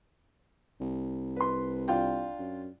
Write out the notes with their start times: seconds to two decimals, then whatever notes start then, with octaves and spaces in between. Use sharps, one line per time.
0.80 C2
1.36 B4 C6
1.88 D4 F4 G5
2.39 F#2